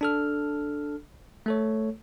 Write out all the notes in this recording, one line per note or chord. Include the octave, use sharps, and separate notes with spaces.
D4 A4 F6
A3 A4 C#5